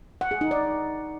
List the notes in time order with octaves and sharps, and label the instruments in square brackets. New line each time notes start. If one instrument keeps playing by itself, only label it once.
[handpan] F#5
G#4
D#4
D5